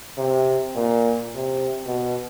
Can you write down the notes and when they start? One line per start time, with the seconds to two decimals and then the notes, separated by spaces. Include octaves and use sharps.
0.18 C3
0.76 A#2
1.35 C3
1.87 B2